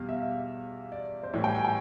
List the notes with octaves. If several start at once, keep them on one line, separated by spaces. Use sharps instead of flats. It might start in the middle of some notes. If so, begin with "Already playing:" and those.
Already playing: E2 B2 G3 F5
E5
D5
C5
A2 E3 G3 C#5
G5
G#5
G5